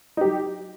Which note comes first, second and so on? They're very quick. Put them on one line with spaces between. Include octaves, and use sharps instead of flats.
D#4 G4 F#3